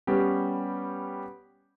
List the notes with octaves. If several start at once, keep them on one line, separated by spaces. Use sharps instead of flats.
G3 B3 C#4 G4